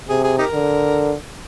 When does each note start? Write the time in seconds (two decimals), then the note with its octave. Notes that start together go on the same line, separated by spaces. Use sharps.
0.09 C3 G#4
0.24 G#4
0.38 D#4 G4 A#4
0.53 D3